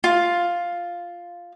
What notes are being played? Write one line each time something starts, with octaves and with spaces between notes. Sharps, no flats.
F4